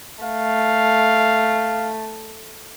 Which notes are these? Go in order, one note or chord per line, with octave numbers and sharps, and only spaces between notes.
A3 F5